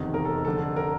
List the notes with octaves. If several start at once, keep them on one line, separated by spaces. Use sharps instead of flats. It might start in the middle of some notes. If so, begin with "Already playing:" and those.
Already playing: F1 E2 C3 D#3
A#4
A4
F1 F2 D3 A4
A#4